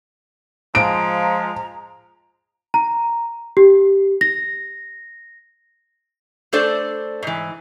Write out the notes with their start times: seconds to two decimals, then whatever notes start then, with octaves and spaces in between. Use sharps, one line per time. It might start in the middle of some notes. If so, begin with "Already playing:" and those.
0.75 F3 G#3 A#5 D7
2.74 A#5
3.57 G4
4.21 A#6
6.53 A3 D4 A4 C5 D5
7.23 G#2 E3